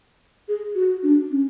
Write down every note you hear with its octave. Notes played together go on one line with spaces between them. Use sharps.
G#4
F#4
D4
C#4